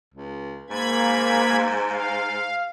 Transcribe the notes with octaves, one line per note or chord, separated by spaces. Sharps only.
C#2
G#2 A#3 B5 G#6
F5